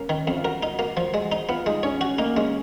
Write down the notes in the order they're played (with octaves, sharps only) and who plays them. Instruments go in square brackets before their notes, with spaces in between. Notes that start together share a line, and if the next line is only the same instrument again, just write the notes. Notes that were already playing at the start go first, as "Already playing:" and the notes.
Already playing: [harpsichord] A#3 [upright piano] C#4
[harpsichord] D#3
F2
[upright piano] F4
[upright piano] F#4 [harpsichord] A#4
[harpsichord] D#4
[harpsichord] A#3 [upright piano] F#4
[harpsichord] F3
G#3
D#4
[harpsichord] B3 [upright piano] F4
[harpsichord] G#3 [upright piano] D#4
[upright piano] C#4 [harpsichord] C#5
[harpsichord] F#4
[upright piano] A#3 [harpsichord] D#4
[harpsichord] G#3 [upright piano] C#4